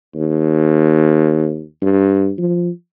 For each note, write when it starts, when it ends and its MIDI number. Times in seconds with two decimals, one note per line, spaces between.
0.15 1.64 39
1.82 2.32 43
2.38 2.70 53